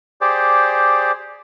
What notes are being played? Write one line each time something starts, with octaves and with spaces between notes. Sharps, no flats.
G4 G#4 C5 D5